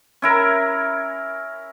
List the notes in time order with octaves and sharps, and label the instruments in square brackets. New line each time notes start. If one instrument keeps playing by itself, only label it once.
[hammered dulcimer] C#4 E4 A#4